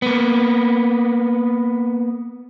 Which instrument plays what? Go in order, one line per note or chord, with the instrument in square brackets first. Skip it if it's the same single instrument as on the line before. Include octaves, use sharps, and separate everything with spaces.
[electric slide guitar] A#3 B3